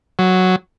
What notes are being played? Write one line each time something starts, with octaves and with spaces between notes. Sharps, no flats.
F#3